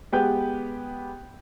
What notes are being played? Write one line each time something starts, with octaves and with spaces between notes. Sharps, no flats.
G#3 B3 G4 B4 G5 G6